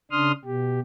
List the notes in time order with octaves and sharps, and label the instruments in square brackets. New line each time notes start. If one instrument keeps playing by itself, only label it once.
[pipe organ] C#3 D4 C6 D#6 F6
B2 G4